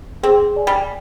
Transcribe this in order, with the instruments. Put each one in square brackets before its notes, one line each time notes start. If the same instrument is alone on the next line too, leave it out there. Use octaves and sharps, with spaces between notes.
[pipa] C4 [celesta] G#4
[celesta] D5 G#5
[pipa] G3